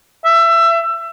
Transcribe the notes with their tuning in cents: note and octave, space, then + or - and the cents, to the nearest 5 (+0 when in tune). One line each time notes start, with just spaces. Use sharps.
E5 +25